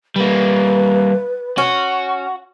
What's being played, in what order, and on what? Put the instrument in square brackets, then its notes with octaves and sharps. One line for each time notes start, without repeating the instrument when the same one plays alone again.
[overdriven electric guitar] G3 A#3 [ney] B4
[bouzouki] C#4 [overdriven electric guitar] F#4